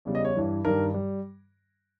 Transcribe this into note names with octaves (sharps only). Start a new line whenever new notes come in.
E2 C#3 G3
D#5
C#5
G2 E3 G3
G2 D#3 G3 A#4
G3